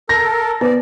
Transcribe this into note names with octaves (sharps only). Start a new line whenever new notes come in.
A4 A#4 A#6
B3 B4 D5